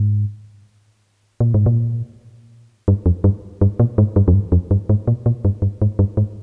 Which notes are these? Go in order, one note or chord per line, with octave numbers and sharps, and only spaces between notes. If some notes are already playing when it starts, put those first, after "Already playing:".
Already playing: G#2
A#2
G#2
A#2
G2
F2
G2
G2
A#2
G#2
G2
F2
G2
F2
G2
G#2
A#2
A#2
G2
G2
G#2
G2
G#2